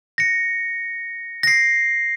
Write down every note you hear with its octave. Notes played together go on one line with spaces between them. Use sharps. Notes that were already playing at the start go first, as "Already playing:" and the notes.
A#6 C#7
A#6 C7